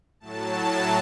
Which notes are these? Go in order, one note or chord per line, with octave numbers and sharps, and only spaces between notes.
A2 F#3 A5